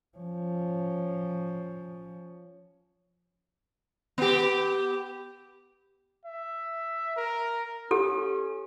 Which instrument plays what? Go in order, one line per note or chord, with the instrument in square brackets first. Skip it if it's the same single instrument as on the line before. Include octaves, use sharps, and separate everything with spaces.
[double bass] F3 C#4
[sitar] B3 G4
[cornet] E5
A#4
[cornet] C#4 [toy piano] G4 A4